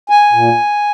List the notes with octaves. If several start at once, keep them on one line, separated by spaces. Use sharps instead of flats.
G#5
A#2